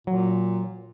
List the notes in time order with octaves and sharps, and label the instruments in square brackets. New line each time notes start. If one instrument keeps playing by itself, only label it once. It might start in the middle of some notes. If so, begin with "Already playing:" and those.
[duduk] A#2 [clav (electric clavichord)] F#3